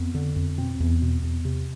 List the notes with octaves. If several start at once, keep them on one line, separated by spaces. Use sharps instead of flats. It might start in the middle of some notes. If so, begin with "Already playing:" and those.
Already playing: F2 B3
D3
F2
B2 C4
E2
B2
E2
C3